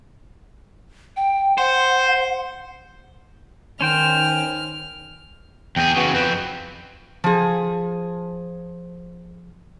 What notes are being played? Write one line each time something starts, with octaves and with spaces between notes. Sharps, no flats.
G5
C5 F#5
D#3 C#4 C5 G5 F6
E2 G#4 G5
C#3 F#3 B3
F2 C4 B4
F3 G#4